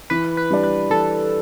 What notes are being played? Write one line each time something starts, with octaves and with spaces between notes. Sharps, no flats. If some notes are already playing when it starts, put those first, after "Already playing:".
E3 B4
B4
G3 D4
B4
E3 A4